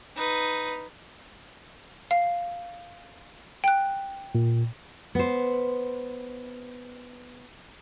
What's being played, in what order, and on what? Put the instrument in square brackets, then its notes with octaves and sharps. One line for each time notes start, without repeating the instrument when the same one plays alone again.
[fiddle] D#4 B4
[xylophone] F5
G5 F#6
[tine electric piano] A#2
[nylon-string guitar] B3 C5